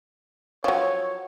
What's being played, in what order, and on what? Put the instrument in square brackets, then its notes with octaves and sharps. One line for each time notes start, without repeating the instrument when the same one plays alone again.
[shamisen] F3 F#3 [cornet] C#5